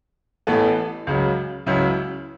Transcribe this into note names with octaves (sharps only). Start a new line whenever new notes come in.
A1 A2 E3 B3 A4
C#2 C#3 F#3
C#2 C#3 F#3 C#4 E4